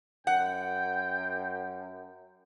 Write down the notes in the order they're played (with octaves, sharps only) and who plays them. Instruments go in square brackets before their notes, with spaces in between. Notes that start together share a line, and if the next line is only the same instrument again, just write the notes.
[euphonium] F#2 [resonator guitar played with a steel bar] F#5 [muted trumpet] G5